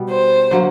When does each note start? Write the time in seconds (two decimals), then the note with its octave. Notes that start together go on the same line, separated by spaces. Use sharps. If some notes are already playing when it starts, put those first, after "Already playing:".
Already playing: B2 G3 B3
0.11 C5
0.51 D3 F#3 A#3